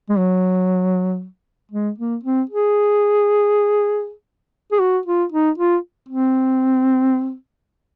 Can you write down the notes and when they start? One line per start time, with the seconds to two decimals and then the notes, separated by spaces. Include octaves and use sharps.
0.09 G#3
0.17 F#3
1.71 G#3
1.98 A#3
2.23 C4
2.49 G#4
4.72 G#4
4.80 F#4
5.05 F4
5.32 D#4
5.58 F4
6.08 C4